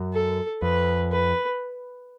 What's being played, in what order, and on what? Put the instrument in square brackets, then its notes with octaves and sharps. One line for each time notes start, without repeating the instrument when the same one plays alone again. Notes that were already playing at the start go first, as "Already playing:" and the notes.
Already playing: [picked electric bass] F#2
[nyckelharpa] A4
[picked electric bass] F2 [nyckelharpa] B4
[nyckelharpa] B4